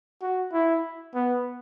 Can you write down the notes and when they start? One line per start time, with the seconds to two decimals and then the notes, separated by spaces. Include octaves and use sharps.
0.22 F#4
0.53 E4
1.15 B3